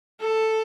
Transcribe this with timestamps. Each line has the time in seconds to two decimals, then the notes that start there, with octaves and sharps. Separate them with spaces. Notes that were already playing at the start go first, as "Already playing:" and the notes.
0.20 A4